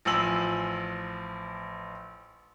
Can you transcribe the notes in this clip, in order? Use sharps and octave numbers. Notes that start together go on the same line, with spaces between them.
A1 F3 G#5 E6 F#7